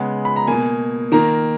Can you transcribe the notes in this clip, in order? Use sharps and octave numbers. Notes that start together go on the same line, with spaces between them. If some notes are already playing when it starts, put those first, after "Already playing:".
Already playing: C#3 G#3 B3 F#5
B5
A#5
B2 A#3 G#5
D#3 A#3 A#5